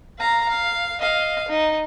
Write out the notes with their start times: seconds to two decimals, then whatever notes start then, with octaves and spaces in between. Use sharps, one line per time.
0.19 F5 A#5
0.49 F5
1.01 D#5 F5
1.48 D#4